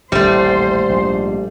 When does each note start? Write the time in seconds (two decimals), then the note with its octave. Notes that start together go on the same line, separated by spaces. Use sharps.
0.12 D#1 A1 G3 A3 C5
0.89 A#1 G#2